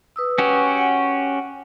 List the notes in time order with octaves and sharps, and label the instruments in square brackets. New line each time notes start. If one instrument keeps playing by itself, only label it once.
[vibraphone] B4 D#6 E6
[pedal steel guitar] C#4 F#4 G4
[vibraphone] F#5 G#5